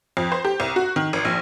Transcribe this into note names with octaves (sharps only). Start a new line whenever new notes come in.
F2
C5
G4
C2
F#4
D#3
G#1
A#1